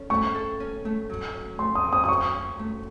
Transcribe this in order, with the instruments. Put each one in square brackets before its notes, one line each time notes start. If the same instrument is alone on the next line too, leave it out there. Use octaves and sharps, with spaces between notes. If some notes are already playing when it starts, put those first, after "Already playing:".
Already playing: [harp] C#4 A4
[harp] A3 [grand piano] C#6
[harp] A4
C#4
A3
F#3
C#4
[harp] A3 [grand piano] C6
[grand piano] D#6
[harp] F#3
[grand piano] D#6
D#6
[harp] F#3 [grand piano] C#6
[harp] C#4
A3